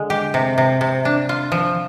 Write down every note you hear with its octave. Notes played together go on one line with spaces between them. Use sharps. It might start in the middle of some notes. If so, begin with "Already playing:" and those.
Already playing: D3 G#3
G4
C3
C3
C3
D4
F4
F3